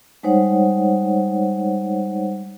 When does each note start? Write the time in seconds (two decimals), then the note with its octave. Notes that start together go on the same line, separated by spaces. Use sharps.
0.23 G3 G#3 D#4 C5 C#5 F#5